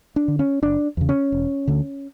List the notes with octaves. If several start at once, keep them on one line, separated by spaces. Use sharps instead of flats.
D4
D3
C#4
F#1 D4
E2 C#3
C#4
E1
D2 D3